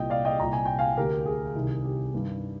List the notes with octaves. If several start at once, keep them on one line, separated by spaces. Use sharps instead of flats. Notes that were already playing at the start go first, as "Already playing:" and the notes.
Already playing: C2 A#2 D#5 G5
D5 F5
D#5 G5
C2 A#2 A#5
G#5
G5
F5 G#5
D2 D3 G4 A#4
G#4
C2 C3 D#3
G4
G2 D#3